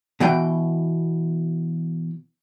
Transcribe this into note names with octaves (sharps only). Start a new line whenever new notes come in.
B2 E3 F#4 G5